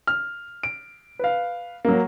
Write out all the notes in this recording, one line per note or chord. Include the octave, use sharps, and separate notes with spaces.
F6
D7
B4 F5
F#3 A#3